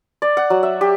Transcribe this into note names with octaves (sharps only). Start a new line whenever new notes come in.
D5
F#5
F#3
E5
G4